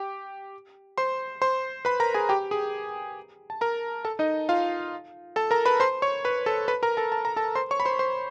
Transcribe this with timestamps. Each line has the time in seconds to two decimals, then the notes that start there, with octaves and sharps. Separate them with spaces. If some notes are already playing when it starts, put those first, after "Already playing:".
Already playing: G4 G5
0.98 C5 C6
1.42 C5 C6
1.85 B4 B5
2.00 A#4 A#5
2.14 G#4 G#5
2.29 G4 G5
2.51 G#4 G#5
3.50 A5
3.61 A#4 A#5
4.05 A4 A5
4.19 D#4 D#5
4.49 F4 F5
5.36 A4 A5
5.51 A#4 A#5
5.66 B4 B5
5.80 C5 C6
6.02 C#5 C#6
6.25 B4 B5
6.46 A4 A5
6.68 B4 B5
6.83 A#4 A#5
6.97 A4 A5
7.12 A5
7.25 A#5
7.36 A4 A5
7.55 C5 C6
7.71 C#5 C#6
7.80 B5
7.85 C5 C6
7.99 C5 C6